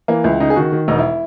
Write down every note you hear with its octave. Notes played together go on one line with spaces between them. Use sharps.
E3 A#3
C#2 E4
C#3 D#4
G#4
D#3 F#4
D#3
E1 D#4
E4